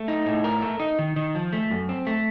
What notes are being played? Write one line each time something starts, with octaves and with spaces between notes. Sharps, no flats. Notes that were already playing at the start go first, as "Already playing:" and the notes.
Already playing: A3
D#4
A2
A#4
A3
D#4
D#3
D#3
F3
A3
F#2
C4
A3